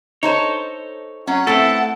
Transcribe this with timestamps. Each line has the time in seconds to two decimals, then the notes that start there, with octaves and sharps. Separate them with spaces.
0.23 D#4 A4 C5 C#5
1.27 F#3 C#4 F#5
1.47 A3 B3 C4 E4 A4